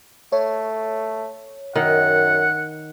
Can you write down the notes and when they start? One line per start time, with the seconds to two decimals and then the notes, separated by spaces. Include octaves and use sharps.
0.32 A3 C#5
1.76 F#2 D#3 F#5